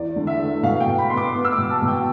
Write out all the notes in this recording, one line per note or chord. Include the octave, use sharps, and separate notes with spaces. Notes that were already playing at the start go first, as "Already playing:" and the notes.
Already playing: E2 D5
D3
E5
A3
B2 F5
G5
B2
B5
B3 C6
D6
B3
E6
D6
B2
A5
B2
G5